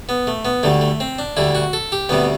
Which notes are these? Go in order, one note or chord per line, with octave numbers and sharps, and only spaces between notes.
B3
A3
B3
D2 D3 G3 A3
A3
C4
D4
D2 D3 G3 E4
F#4
A4
G4
D2 C3 G3 B3